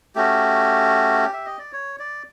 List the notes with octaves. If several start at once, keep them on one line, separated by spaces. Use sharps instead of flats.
A3 C#4 F#4 G4
E5
D#5
D5
C#5
D5